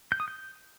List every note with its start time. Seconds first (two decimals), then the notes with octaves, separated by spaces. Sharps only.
0.12 G6
0.20 D#6
0.28 G6